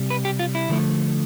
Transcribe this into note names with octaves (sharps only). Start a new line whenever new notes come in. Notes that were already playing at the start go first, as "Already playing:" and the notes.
Already playing: C3 G3
B4
G4
F4
E4
D3 F3 A3